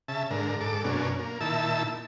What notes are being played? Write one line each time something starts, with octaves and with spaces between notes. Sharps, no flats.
C#3 E5 A5
G#2 D3 A#4
G#2 A4 D6
F#2 B2 A#3 C#4 D4
A#3
A#2 D#3 E4 A5 E6